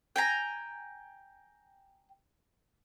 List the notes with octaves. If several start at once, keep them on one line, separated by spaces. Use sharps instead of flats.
G5 G#5 A#5